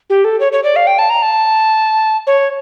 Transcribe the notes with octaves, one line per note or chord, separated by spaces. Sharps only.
G4
A4
C#5
C#5
D5
F5
G5
A5
A#5
A5
C#5